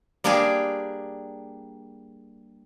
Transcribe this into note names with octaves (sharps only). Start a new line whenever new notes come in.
G3 A#3 D4 G4 G#4 D5